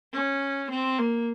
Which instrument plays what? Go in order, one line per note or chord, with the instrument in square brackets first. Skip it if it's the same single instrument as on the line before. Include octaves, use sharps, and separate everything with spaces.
[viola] C#4
C4
A#3